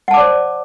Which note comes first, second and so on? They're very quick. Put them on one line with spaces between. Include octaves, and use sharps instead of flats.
F#5 A5 D6 D5 C5